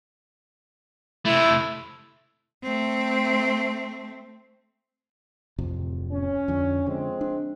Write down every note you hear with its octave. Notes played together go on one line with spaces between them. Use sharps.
C3 A3 E4
A3 C4
D1 F2 C3
C#4
F2 D3
D3 F3 G#3 C4
D4